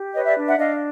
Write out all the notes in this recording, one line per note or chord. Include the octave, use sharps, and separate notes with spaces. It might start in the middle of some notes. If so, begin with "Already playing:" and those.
Already playing: G4
B4 C#5 D#5
D5 E5
D4
E5 F#5
D4 D#5 F5